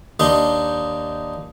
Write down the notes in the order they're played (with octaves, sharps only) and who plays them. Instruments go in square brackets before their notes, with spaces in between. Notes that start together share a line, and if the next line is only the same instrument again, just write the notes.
[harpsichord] D#2 D4 D#4 C6